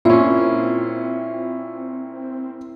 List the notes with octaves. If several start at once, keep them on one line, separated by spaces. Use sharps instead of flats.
A#2 C4 C#4 E4 F4